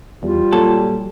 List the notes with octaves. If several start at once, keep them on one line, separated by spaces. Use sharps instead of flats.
E2 G3 F4
A#2 F#3 A4